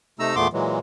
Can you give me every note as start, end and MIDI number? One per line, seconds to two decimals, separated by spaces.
0.19 0.35 48
0.19 0.35 57
0.19 0.35 63
0.19 0.35 82
0.19 0.35 88
0.35 0.47 40
0.35 0.47 46
0.35 0.47 57
0.35 0.47 59
0.35 0.47 84
0.35 0.47 86
0.53 0.79 46
0.53 0.79 52
0.53 0.79 54
0.53 0.79 56